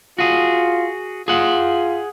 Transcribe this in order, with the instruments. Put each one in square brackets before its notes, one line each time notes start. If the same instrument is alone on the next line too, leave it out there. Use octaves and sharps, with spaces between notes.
[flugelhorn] F4 [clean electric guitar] F#4 G#4
[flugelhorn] F4 [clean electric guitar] G#4 F#5